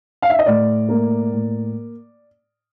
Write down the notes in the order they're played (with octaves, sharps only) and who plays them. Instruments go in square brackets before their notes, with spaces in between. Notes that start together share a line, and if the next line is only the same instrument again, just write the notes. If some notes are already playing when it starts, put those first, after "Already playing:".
[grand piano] F5
E5
D#5
A2 D5
A#3
A2